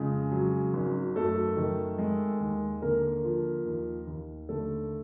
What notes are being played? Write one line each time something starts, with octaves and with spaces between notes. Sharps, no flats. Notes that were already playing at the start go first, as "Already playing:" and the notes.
Already playing: F2 C#3 G#3 G#4
F#3
G#1
F#2 A3 A4
D#3
G#3
D#2
D3 A#3 A#4
F3
D#2
D#2
D3 A3 A4